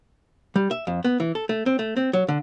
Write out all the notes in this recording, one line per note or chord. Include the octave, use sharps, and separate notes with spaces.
G3
E5
F2
B3
E3
A4
A3
C4
A3
C4
F#3
D3